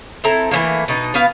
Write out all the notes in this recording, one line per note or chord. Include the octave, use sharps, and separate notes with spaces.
C4 E4 A4 A#5
E3 F#3 A3 A#3
B2 D#4
B2 B3 F5